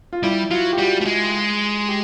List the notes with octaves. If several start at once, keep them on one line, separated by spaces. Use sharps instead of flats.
F4
G3 E4
F#3 F4
G4
G3 F#4
A3
G#3
G4